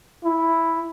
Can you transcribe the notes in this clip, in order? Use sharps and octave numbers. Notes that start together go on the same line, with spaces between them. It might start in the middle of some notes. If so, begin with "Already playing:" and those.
E4